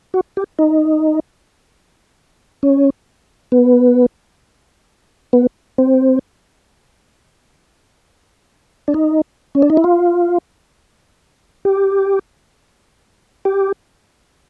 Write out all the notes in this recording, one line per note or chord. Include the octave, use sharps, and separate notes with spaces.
F#4
G4
D#4
C#4
B3
B3
C4
D4
D#4
C#4
D4
D#4
E4
F4
G4
G4